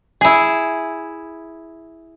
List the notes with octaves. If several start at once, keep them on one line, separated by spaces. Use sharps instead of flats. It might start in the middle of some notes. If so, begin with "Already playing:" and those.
E4 G#4